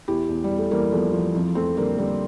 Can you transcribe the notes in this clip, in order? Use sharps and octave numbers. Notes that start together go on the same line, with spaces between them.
E2 E4 G4
E2
G3
E2
A3
E3 G3 A#3
E2 F3 A3
E3 F3
F2 F3
F2 A3 C4
D3 G3 A#3
D3 G3 A#3